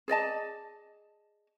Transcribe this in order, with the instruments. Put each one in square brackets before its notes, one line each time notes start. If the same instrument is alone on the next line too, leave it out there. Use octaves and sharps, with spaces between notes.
[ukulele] G#4 D5 D#5 A5